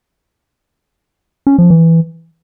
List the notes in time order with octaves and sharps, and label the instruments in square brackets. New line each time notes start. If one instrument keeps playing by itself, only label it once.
[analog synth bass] C#4
F3
E3